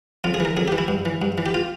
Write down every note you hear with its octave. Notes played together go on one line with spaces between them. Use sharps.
F2 F4
G#4
E3 A#4
F2 G#4
G4
E3
E4
G2
E3
G2
E3
G4
F4